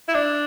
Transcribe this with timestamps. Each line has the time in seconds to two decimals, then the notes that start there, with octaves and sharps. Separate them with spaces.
0.08 E4
0.14 D4